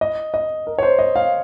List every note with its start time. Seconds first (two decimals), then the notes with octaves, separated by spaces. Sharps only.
0.01 D#5
0.34 D#5
0.67 A#4
0.78 C#5
0.83 C5
0.99 D#5
1.16 F5